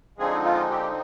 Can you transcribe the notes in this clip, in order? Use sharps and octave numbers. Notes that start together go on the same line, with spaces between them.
D3 F3 G#3 C4 D#4 G#4
F4
G4